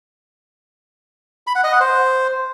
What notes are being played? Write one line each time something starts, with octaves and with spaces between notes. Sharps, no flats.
B5
F#5
D#5
F#5
C5